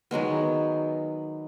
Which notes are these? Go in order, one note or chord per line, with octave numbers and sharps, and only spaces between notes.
D#3 F#3 G#3 B3